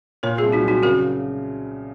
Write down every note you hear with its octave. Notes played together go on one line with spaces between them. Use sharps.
A#2 A#4 C#5
C2 F4 G#4
D#4 F#4
F#3
D#4 F#4
C#3 F#4 A#4